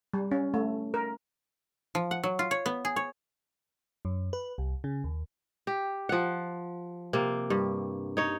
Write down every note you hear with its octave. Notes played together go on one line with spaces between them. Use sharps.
G3
C#4
A3
A#4
F3
F#5
F#3
F4
C#5
B3
G#4
C#5
F#2
B4
C2
C#3
D#2
G4
F3 F#5
C3 A#3
G2
D#4 C#5